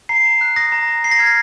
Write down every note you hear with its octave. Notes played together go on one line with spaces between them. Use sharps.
A#5 C7
A#5
F#6
D#6 A#6
A#5
A#5
A#5 C7
A#6
F6 G#6
A#6